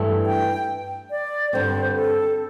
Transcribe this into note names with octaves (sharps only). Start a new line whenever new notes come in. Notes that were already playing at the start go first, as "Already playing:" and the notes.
Already playing: G2 E3 A3 D4 A4
G5
D5
G2 D3 C4 C5
A4